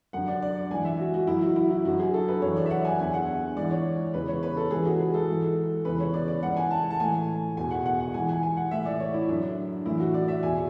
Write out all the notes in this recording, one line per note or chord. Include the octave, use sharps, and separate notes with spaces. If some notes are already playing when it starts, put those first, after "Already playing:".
F#2 D3 F#5
D5
D5
G#2 E3 G#5
E5
F#4
F#4
F#2 E3 E4
F#4
E4
E4
F#2 D3 F#4
G#4
A4
B4
F#2 E3 C#5
D5
E5
F#5
G#5
E2 D3 G#5
F#5
G#2 E3 D5
C#5
E2 C#3 E3 B4
C#5
B4
A4
G#2 E3 G#4
F#4
G#4
A4
G#2 E3
E2 C#3 E3 B4
C#5
D5
D5
G#2 E3 F#5
G#5
A5
A5
A2 E3 G#5
E2 B2 G#5
F#5
F#5
F#5
G#2 E3 G#5
G#5
G#5
F#5
A2 E3 E5
D5
C#5
E4
F#2 D3 D4
A2 E3 E4
F#4
D5
E5
E2 B2 G#5